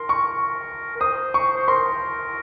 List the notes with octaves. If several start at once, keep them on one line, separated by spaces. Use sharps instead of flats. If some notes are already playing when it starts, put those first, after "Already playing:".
Already playing: A#4 C6
C#6
A#4
C5 D#6
C#6
C5
A#4 C6